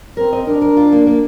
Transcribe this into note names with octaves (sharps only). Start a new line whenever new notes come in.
C4 A#4
D#5
D4 A#4
A#4
F4
A#3
A#3